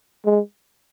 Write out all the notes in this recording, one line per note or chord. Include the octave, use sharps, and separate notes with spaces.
G#3